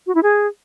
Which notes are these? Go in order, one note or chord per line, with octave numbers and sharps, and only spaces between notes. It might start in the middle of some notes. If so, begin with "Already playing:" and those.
F#4
E4
G#4